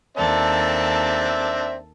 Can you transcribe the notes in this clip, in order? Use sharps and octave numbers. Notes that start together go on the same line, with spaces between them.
D#2 C4 D4 A4 E5 A5